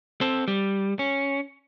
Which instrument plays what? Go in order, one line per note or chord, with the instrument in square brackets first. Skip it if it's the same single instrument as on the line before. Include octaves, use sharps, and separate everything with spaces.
[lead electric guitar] C4 A4
G3
C#4